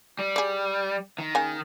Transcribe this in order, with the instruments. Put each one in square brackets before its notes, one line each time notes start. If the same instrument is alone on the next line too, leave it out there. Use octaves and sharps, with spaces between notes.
[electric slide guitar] G3
[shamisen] G#4 D5
[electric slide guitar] D#3
[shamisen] C#3 A#3 G#5